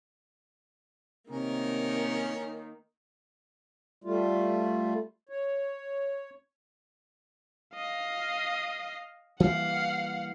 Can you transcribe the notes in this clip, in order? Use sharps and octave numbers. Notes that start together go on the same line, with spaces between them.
C3 D#3 A#3 C#4 A#4
G3 A3 F4
C#5
D#5 F5
E3 G3 A#3 F5 F#5